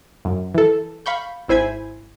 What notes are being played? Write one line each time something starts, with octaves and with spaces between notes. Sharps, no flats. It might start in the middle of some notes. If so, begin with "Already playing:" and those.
F#2
E3 A4
F5 B5 C#6 G6
G#1 E4 C5 G#5 B5 G#6